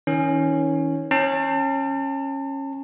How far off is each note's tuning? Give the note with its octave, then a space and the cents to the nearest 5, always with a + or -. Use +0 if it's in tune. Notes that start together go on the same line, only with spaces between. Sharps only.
D#3 +40 C#4 +0
C#4 -20 A5 +35